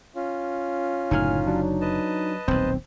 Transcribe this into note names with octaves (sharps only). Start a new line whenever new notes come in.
C#4 F4
F#1 A2 D3 D#4 G#5 F6
F#3 D4
B4 D#5 A5
D#1 B1 C4 C5